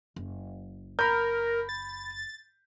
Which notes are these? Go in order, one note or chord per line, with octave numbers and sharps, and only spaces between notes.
F#1
A#4 B5 G6
A6